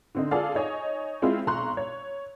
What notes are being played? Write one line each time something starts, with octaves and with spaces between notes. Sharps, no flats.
D3 C4 D#4
F4 G#4 A4 D5 F5
D#4 C#5 D#5 G#5
G#3 C4 E4 F4
B1 A#5 C6 C#6 F#6
C#5